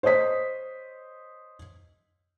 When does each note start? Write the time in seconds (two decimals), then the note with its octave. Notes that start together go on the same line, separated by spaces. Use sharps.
0.03 C5 C#5 D#5 D#6 B6